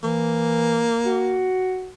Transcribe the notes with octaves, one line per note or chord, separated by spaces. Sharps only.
E3 A#3
F#4